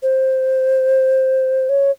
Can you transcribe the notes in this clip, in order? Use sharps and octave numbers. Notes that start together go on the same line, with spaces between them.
C5
C#5